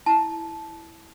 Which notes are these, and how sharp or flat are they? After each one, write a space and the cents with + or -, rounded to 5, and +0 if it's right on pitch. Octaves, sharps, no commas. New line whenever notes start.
E4 +0 A5 -15